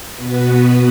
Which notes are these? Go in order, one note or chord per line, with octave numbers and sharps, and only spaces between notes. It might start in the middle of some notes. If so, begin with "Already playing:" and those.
B2 B3 F#4 B4